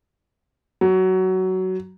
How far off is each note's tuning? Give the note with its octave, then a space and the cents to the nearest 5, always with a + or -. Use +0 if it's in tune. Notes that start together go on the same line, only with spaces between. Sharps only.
F#3 +15